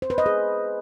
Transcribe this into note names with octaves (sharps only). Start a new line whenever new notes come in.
C5
B4
D#5
G#4